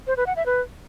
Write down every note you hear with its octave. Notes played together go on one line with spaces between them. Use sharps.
C5
B4
F#5
E5
B4